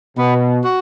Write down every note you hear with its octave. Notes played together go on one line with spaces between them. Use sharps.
B2 B3
F#4